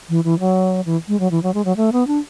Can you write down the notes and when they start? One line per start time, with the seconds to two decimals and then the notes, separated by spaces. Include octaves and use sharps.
0.09 E3
0.24 E3
0.40 F#3
0.86 E3
1.08 G#3
1.20 F#3
1.31 E3
1.43 F#3
1.54 G#3
1.65 F#3
1.77 A3
1.92 B3
2.07 D4